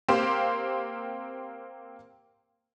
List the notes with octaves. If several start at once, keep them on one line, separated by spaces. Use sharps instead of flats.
A#3 C4 G4 C5 F5